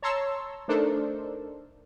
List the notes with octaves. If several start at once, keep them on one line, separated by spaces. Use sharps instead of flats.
C#5 A5 A#5 C6 C#6 E6
A3 D4 D#4 A4 A#4 C5